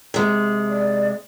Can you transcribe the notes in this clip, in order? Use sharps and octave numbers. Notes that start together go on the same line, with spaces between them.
C3 G#3
D5